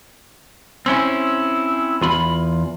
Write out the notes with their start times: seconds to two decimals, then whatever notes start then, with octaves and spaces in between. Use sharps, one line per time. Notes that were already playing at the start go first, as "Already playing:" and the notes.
0.86 C4 C#4 E4
2.01 E2 F4 B5